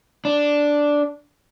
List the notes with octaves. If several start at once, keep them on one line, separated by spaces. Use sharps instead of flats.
D4